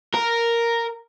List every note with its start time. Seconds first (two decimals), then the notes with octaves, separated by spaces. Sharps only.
0.15 A#4